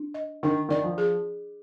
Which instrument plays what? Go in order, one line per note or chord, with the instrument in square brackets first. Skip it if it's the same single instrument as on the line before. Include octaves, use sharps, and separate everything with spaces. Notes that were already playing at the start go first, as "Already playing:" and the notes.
Already playing: [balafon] D4
D#5
[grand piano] D#3 [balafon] D4
[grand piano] D#3 [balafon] D5
[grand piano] F3
[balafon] G#4